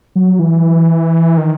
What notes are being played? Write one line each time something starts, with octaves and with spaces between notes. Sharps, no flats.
F#3
E3
D#3